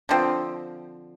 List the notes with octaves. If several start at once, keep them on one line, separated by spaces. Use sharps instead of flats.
D3 F3 C4